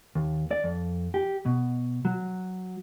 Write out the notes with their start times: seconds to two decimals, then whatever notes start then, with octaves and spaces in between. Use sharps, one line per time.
0.15 D#2
0.51 D5
0.64 F2
1.14 G4
1.46 B2
2.05 F#3